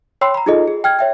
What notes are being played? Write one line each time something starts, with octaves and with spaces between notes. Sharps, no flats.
C#5 G5 B5 C6 E6 C7
A#5 B5
D#4 F4 G#4 A4 D#5
G#4
G5 F6 G#6
C#5 E5 G5